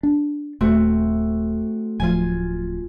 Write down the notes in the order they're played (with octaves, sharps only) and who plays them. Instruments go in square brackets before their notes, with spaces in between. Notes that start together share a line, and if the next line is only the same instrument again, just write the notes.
[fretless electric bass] D4
[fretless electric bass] D#1 [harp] A3 C4 F#4
[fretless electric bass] D1 F3 [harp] F4 G#5